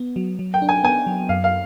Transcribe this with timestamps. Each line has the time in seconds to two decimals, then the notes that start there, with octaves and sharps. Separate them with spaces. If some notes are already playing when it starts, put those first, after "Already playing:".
Already playing: B3
0.16 F#3
0.39 F#3
0.54 G5
0.62 D4
0.69 G#5
0.84 B3 G#5
1.07 F#3
1.29 F#2 F5
1.44 F5